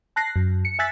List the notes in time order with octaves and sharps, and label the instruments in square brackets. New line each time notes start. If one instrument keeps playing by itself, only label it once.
[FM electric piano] A5 F#6 A#6 C7
F#2
C#7
E5 G#5 E6 F#6 A6 B6